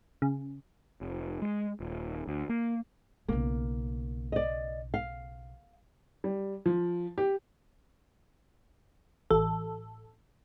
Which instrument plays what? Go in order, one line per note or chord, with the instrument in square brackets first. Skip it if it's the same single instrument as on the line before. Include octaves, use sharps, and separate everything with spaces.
[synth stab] C#3
[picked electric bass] F1
G#3
D#1
D2
A#3
[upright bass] B1 C#3 [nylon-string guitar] A#3
[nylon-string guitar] D5 D#5
F5
[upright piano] G3
F3
G4
[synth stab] A1 A4